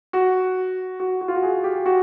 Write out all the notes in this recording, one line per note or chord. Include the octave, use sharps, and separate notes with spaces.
F#4
F#4
F#4
F4
F#4
G#4
G4
F#4